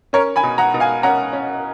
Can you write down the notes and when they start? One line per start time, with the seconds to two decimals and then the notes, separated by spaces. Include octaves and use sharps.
0.13 C#4 A#4 C#5
0.36 G#5 B5
0.43 B2
0.58 F#5 A#5
0.74 B2
0.80 F5 G#5
1.03 C#4 F#5 A#5
1.33 C#4